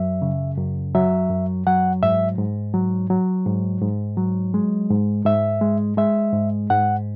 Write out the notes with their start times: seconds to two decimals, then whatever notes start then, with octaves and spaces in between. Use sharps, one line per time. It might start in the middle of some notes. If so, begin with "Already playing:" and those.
Already playing: F#2 F#3 E5
0.22 C#3
0.58 F#2
0.94 F#3 E5
1.30 F#2
1.67 F#3 F#5
2.03 G#2 E5
2.38 G#2
2.74 F#3
3.10 F#3
3.46 G#2
3.81 G#2
4.17 F#3
4.54 G#3
4.90 G#2
5.25 G#2 E5
5.61 G#3
5.97 G#3 E5
6.33 G#2
6.70 G#2 F#5